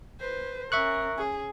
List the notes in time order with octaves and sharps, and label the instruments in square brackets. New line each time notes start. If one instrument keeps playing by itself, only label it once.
[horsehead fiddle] B4 C5
[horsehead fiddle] C#4 A#4 [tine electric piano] E5 C#6 F#6
[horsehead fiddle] C#4 G#4